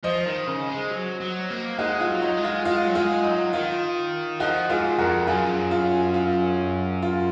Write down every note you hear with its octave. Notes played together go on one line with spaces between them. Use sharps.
F3 C5 D#5
D#3
C#3
G#3
F#3
F#3
A#3
G#3 D#4 F#4
F4
F#3
D#4
G#3
F4
G#3 F4
F#3
G#3 F4
F#3 D#4
D#3 F4
F3 D#4 F#4
G#2 F4 G#4
F2 F#4 A#4
F#2 F4 G#4
F4
F4
F4